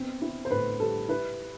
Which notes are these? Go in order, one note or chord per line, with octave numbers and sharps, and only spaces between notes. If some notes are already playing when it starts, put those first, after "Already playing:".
Already playing: B3 C4
E4
C5
A2 B4
G3 A4
E4 B4